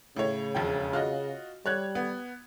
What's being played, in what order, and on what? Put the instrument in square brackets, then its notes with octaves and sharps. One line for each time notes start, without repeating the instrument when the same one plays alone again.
[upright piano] A2 C#5 [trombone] C#3
[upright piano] E1 F2 G5
F4 F#4 D#5
[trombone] G3 [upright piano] C#5 F#6 G#6
[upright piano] B3